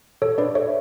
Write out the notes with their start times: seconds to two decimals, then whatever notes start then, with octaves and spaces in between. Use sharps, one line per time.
0.22 A4 C#5
0.38 D4 B4 D5
0.55 A4 C#5 E5